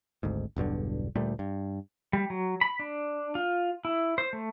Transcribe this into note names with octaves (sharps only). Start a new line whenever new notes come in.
G#1 D2 G#2
E1 B1 G2 D3
D2 A#2 G3 A3
G2
G3
F#3
B5
D4
F4
E4
C5
A3